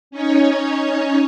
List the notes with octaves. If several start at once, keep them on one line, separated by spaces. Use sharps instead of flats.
C#4 D#4 C#5